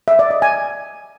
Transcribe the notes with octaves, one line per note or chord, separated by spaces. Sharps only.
E5
D5
D#5
G#5